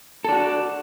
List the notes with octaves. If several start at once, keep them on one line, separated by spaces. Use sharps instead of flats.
D4 F#4 A4